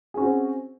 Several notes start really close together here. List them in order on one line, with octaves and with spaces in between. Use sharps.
G#4 C#4 F#4 C4